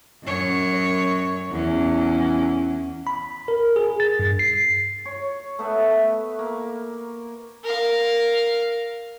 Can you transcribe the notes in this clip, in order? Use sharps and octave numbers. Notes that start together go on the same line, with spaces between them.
F#2 C#5
E2 C#4
B5
A#4
G#4
A6
G2
C7
C#5
A3 B3 B4 E5
A#3
A#4 F5